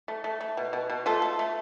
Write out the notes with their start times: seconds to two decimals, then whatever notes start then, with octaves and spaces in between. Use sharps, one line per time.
0.08 A3
0.24 A3
0.41 A3
0.57 B2
0.73 B2
0.90 B2
1.06 A3 F4 A4
1.22 A3
1.39 A3